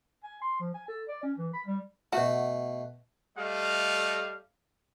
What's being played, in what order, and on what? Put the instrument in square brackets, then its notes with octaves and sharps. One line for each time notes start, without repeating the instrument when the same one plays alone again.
[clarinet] G#5
C6
F3
G#5
A4
D5
C#4
E3
B5
G3
[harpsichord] B2 A3 [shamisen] F#4
[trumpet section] G3 A3 D#5 F5